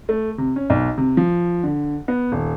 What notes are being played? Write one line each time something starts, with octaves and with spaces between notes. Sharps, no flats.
A3
C3
C#4
B1
C3
F3
D3
B3
D#1